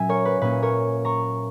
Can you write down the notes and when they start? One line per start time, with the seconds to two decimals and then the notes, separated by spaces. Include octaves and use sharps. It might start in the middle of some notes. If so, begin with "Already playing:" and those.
Already playing: A#2 F#3 C#4 E5 G#5
0.09 A#4 C#5
0.25 B4
0.41 A#2 A#3 C#4 B4
0.62 A#4 C#5
1.05 A#5 C#6